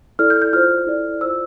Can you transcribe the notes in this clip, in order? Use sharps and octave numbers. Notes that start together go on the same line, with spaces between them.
E4 A4 D5 F6
G6
G6
F4 C5 F6
E4 A4 D5
F4 C5 E6